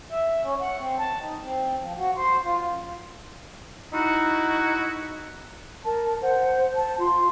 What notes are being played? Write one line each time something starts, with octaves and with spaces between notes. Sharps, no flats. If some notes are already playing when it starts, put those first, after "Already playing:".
E5
C#4
F#5
C4
A5
D#4
C4
F3
F#4
C5
F4
F#2
D#4 E4 F#4
A#4 A5
C5 F#5
A5
F4 C6